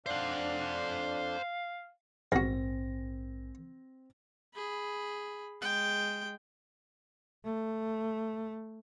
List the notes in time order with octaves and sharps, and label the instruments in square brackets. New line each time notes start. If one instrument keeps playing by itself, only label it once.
[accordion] F2 D4 [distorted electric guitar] C5 F#5 [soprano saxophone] F5
[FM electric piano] A#1 G#2 [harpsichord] E2 F#4 [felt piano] C4 A#6
[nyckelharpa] G#4 B5
G#3 G5
[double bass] A3